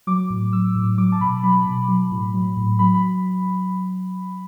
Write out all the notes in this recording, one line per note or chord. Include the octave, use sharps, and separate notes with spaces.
F#3 D6
A2
F#3 E6
A2
F#3 D6
A5
B2 B5
F#3 B5
B2
F#3
A2
F#3
A2
F#3 B5
B5